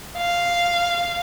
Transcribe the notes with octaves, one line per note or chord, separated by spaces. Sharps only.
F5